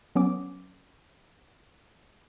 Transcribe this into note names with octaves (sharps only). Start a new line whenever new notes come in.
F#3 B3 C#4 D6